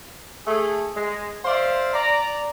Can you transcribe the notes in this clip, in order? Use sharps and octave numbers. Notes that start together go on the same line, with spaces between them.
A3 G#4
G#3
C5 D5 E5 F5
D5 A#5